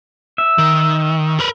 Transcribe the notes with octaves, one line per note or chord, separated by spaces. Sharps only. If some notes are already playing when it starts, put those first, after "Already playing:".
E5
D#3
A#4 B4